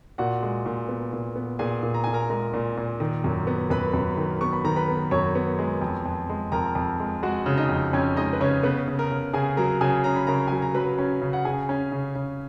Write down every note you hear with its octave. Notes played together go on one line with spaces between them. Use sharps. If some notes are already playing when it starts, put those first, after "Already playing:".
A#2 F#4 F#5
G#3
A#2
B3
A#2
B3
A#2 G#4 G#5
A#2
A#5
A#2 G#5
A#4 A#5
G#3 A#4 A#5
A#2
A#2
D#3
F#2
B3
F#2 B4 B5
F#2
D#3
B3 C#6
B5
D#3 A#5
B4 B5
B3
F#2 C#5 C#6
B3
G#3
F2
F2
G#3
F2 A#4 A#5
F2
G#3
G#3 F#4 F#5
C#3
D#4 D#5
F2
F2 C#4 C#5
G#3 D#4 D#5
B4
C#3 C#4 C#5
C#3 B3 B4
C#3
A#4
C#3
C#3 G#4 G#5
F#3 A#4 A#5
C#3 G#4 G#5
C#4 A#5
B5
C#3 A#4 A#5
F#3 G#5
A#5
F#3 B4 B5
C#4
C#3
F#5
C#3 G#4 G#5
C#4
C#3
C#3